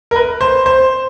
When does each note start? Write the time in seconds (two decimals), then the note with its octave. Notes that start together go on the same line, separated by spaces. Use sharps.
0.11 A#4
0.16 B4
0.41 C5
0.66 C5